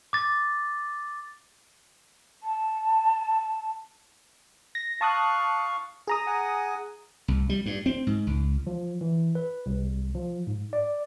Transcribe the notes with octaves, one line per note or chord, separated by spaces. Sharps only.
D6 A6
A5
A#6
F5 A5 C#6 D#6 F#6
G#4 A#5 D#6
F#5 G#5
C2
G3
G2
C4
G#2
C#2
F3
E3
B4
C2
F3
G#2
D5